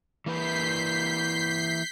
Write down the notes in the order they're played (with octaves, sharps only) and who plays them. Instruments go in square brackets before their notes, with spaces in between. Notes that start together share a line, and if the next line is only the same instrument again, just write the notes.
[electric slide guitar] E3 A#3 B4 [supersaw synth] G6 B6 C7